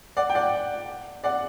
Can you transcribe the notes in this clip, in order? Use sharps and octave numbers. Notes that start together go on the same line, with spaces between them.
D5 F#5
G5
D5 F#5
D5 F#5